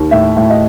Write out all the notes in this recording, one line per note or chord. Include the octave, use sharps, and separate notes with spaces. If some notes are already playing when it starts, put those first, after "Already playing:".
Already playing: D#2
A2 E5
A2
D#5